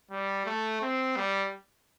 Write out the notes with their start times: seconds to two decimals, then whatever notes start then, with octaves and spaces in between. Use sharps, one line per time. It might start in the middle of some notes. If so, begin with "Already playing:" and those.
0.11 G3
0.46 A3
0.82 C4
1.16 G3